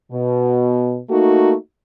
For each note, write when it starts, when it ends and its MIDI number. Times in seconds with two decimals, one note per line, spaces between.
0.12 1.00 47
1.10 1.54 57
1.10 1.54 58
1.10 1.54 63
1.10 1.54 66